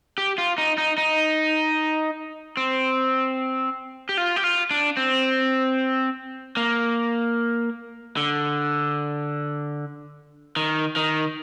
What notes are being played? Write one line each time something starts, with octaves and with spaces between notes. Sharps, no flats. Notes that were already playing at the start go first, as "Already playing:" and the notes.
G4
F4
D#4
D#4
D#4
C4
G4
F4
G4
F4
D4
C4
A#3
D3
D#3
D#3